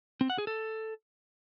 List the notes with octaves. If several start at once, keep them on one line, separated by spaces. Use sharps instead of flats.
C4
F#5
G#4
A4